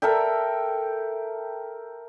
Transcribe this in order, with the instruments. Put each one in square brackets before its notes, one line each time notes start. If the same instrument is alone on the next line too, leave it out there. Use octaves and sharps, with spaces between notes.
[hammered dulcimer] A4 A#4 E5 G5